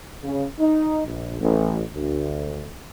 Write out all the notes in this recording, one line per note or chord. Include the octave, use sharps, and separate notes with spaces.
C#3
D#4
A#1
A1
D2